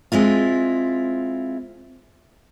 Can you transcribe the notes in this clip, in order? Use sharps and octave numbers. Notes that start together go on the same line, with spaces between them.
G#3 C4 E4 F4